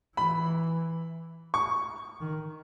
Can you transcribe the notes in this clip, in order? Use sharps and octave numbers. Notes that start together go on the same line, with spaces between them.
E3 B5
C#6
D#3